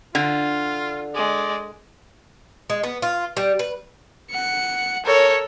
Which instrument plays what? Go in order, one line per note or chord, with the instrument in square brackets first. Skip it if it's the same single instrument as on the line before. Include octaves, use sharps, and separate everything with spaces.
[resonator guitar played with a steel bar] D3 [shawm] F4
[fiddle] G#3 [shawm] D5
[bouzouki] G#3
B3
F4
G3
B4
[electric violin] F#5 C#7
[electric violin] A4 A#4 [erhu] C#5